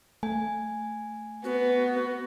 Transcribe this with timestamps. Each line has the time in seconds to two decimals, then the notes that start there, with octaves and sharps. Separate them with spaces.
0.23 A3 G#5
1.44 B3 F#4